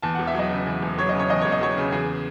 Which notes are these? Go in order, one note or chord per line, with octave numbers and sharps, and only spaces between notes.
E2 A5
E1 F#5
E5
F#3 D#5
C#3
E2
E1
F#3 C#5
C#3 D#5
C#5
E2 D#5
E1 C#5
D#5
F#3 C#5
C#3
E2 G#4